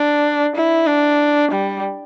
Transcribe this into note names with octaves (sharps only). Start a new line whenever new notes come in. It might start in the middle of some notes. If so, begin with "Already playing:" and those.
Already playing: D4
E4
D4
G3